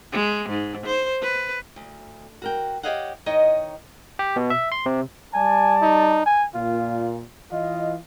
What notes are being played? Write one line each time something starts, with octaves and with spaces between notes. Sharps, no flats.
G#3
G#2
C5
B4
D2
F#4 A#4 G5
G4 G#4 C#5 D#5 F5 F#5
D#3 D#4 C#5 D#5
G4
B2
E5
C6
C3
G3 D5 G#5 A5
D#4
G#5
A#2 F4
E3 F4 D#5